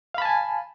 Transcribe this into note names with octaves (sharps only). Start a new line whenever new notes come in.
F5 G#5 A5 B5